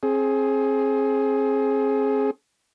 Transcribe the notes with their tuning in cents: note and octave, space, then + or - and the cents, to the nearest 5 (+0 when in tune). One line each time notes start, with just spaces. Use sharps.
C4 +35 G#4 +20